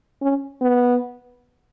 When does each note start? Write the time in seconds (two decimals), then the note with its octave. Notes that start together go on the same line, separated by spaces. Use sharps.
0.22 C#4
0.61 B3